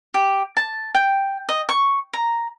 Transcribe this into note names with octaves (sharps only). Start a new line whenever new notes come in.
G4
A5
G5
D#5
C#6
A#5